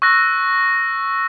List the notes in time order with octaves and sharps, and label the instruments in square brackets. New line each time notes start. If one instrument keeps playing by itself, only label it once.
[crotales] C#6 E6 F#6 A#6